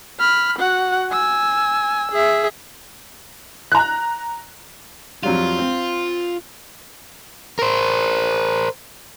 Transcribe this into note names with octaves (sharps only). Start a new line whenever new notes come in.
B5 F6
F#4 F#5
G#5 E6
G#4 E5
A#5 F#6
F2 F#3 G3 F4
C4
A#4 C5